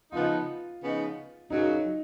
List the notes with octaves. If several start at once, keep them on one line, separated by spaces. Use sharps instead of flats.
C#3 F3 B3 D#4 F4
C#3 F3 B3 D#4
F#2 C#3 F#3 D#4